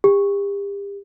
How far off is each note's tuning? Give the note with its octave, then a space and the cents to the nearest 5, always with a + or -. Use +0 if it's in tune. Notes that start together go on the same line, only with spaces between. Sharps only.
G4 +35